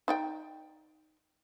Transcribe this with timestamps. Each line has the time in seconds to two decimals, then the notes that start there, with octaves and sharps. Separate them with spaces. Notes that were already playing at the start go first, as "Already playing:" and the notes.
0.08 D#4 D5 G5